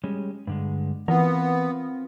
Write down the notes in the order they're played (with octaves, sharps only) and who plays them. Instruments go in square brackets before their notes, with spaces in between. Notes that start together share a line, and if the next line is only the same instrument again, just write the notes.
[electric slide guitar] G3 G#3 C#4
G2 D3 G#3
[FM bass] E3 [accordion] B3 [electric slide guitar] C4 F4 A#4